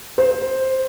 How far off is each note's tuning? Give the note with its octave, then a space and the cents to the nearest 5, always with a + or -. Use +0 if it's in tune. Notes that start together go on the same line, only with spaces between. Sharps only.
C5 +5